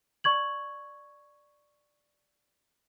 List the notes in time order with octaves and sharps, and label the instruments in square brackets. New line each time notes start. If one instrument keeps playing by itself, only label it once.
[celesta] D5 C#6 G#6 F#7